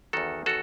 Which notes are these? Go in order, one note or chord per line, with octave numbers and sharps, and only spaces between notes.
E2 D#3 F#4 A4
F#4 A4